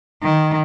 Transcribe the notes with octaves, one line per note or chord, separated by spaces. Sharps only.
D#3